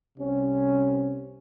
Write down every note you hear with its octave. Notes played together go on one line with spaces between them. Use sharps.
C2 C3 C#4